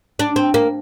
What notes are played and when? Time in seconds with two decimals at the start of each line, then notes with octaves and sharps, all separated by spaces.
0.19 D4
0.36 C4
0.54 A#3